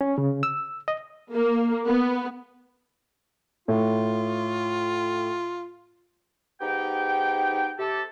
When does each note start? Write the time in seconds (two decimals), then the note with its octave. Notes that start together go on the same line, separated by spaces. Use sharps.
0.01 C#4
0.18 C#3
0.43 E6
0.88 D#5
1.33 A#3
1.86 B3
3.68 A2 F4
6.61 G#2 B3 D#4 G4 G5
7.79 C3 G4 A4